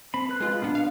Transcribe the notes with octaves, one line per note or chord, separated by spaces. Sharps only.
C4 B5
B4 F#6
G#3 F4
A#2 B3 D4
F5